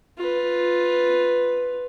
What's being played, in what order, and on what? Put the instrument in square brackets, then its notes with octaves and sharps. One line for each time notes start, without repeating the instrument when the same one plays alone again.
[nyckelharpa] F4 B4